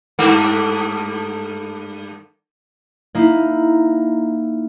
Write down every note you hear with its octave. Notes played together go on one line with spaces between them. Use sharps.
G2 A3 A#3
A#3 D#4 E4